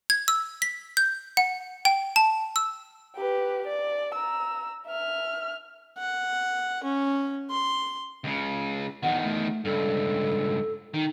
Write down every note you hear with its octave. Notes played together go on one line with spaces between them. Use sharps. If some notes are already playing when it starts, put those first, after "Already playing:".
G#6
E6
B6
G6
F#5
G5
A5
E6
G4 B4
D5
A#5 E6
E5 F6
F#5
C#4
C6
C#2 C#3
E2 D#3 F#5
A3
C#2 G2 A4
D#3 D#4